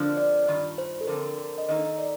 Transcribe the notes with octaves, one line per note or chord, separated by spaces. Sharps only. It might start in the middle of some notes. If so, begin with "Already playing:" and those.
Already playing: F2 D3 F3 A#3 D4
D5
G2 D#3 F4
C5
A4
D3 F3 C4 A#4
A#4
D#5
D#3 A#3 D#4 A4 D#5
D5